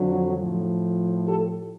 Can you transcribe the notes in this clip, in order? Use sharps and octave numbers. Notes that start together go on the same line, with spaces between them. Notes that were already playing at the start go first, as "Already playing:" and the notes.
Already playing: F2 D3 F#3
F3
A2
G4 A4